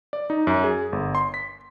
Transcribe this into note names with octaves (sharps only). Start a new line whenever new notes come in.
D5
D#4
F#2
G#4
G1
C6
B6